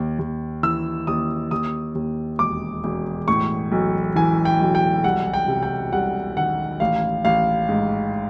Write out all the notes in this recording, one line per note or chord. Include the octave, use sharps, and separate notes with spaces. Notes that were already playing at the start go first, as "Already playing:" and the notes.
Already playing: D#2
D#2
E3 E6
D#2 D#6
D#2 D#6
D#2
E1 D6
E1
A2 C#6
B1
E3 G#5
G5
B1
G5
C2 F#5
G5
C3
G5
C2 F#5
D#3 F#5
A1 F5
A1 F5
G#2